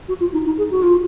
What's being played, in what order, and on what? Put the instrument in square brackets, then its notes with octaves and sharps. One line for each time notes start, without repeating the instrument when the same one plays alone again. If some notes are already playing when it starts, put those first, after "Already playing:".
[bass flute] F#4
F4
D#4
D#4
G#4
F#4
F4